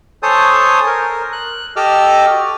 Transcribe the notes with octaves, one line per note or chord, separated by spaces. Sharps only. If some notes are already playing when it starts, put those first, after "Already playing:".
A4 C5 C#5 G#5 A5 D#6
A#4
F#6
G4 A4 D#5 D6 E6 F6
F#4